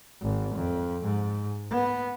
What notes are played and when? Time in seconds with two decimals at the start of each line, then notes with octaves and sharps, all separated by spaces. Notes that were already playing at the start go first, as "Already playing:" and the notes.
0.22 G#1
0.56 F2
1.04 G#2
1.71 B3